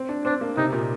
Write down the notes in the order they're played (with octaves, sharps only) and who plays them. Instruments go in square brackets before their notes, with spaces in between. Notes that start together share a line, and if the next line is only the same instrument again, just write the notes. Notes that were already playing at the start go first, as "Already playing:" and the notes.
Already playing: [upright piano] C4
D4
[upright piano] C4 [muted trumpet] D4
[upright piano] A#3
[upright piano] C3 [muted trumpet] D#4
[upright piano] A#2